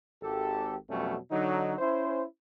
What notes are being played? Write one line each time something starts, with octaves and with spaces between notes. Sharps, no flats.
G#1 G4 A4
F2 B2 F#3 G3 A3 C#4
D3 F#3 D#4
C#4 E4 C5